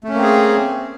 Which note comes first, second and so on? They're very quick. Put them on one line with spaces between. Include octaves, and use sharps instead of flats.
A3 C#4 A#3 C4 G#4